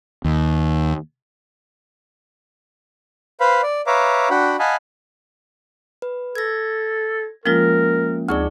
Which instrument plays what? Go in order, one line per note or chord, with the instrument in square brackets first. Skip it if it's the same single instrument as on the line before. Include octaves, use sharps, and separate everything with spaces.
[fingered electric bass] D#2
[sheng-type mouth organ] B4 C5 F5 B5
D5
B4 C#5 E5 F5 A#5 D6
D4 F#4 F#5 G5 B5
D#5 F5 F#5 G#5 A5 B5
[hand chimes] B4
[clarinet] A4 [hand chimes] G#6 A#6
[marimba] F3 G#3 F4 [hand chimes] A#3 C#4 [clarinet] A#4
[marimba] D2 C#6 [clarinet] C4 [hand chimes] D#4 G#4 D5